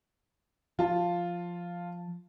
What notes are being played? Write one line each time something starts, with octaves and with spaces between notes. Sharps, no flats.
F3 F4 A5